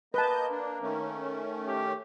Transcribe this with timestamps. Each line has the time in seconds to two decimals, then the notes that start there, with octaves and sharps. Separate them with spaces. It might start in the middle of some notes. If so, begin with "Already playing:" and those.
0.14 A#3 B4 D#5 A5 G6
0.50 D4
0.82 D#3 A3 C#4
1.67 G4